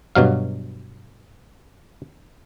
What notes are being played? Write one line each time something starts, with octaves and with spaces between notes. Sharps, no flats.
G2 B2 F#3 F5